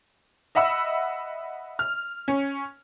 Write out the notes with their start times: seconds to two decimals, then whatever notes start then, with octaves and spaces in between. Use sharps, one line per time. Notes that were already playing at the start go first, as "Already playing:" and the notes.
0.55 D#5 E5 F#5 B5 E6
1.79 F6
2.28 C#4